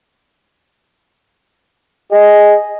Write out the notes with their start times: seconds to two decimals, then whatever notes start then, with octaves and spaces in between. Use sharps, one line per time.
2.11 G#4 D#5